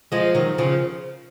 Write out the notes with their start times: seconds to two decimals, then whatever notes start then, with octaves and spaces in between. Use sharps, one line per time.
0.12 F3 G#3
0.35 D#3 F#3
0.58 C#3 F3